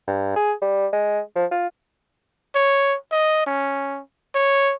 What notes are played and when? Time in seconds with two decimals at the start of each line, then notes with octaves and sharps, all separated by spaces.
0.08 G2
0.36 G#4
0.62 G3
0.93 G#3
1.36 F3
1.51 F4
2.55 C#5
3.12 D#5
3.47 C#4
4.35 C#5